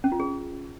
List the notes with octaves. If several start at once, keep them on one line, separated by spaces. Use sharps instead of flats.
C#4
F4
G#4